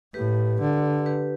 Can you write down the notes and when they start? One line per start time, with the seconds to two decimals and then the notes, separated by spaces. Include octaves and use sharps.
0.14 A2 G4 B4
0.60 D3
1.06 G4 B4